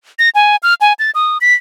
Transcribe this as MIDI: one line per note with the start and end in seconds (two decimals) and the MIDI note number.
0.19 0.29 94
0.35 0.56 80
0.63 0.74 89
0.81 0.93 80
0.99 1.11 93
1.15 1.38 87
1.41 1.54 95